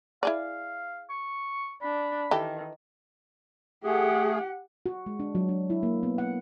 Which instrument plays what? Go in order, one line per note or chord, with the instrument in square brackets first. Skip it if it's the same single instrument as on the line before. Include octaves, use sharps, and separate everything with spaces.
[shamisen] E4 G#4 D5 [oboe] F5
[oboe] C#6
[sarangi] D4 [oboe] B5
[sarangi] D#3 [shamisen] E3 G4 A4
[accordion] A3 G#4 [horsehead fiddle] G4 F#5
[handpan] F#4
G#3
D4
F#3
D4
E4
A#3
B3
F#5